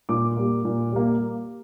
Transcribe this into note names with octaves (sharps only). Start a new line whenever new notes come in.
A#2 D6
G3 A#3
A#2
G3 A#3